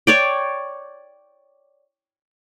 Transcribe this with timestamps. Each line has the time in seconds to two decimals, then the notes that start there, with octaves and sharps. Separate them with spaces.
0.07 C#5 D5 G5